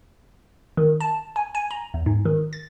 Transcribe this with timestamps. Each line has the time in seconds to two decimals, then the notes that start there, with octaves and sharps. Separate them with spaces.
0.77 D#3
1.00 A5
1.36 G#5
1.55 G#5
1.71 A#5
1.94 E2
2.06 G#2
2.25 D#3
2.53 A6